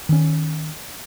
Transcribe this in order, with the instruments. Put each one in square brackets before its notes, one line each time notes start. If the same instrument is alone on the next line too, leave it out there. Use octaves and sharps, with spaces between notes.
[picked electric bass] D#3 C#4